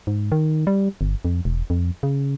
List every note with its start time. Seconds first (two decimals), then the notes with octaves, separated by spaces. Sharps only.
0.07 G#2
0.32 D#3
0.67 G3
1.01 G1
1.25 F2
1.45 E1
1.70 F2
2.03 C#3